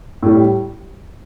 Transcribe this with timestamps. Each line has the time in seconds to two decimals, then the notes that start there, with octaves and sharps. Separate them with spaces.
0.23 A2 G3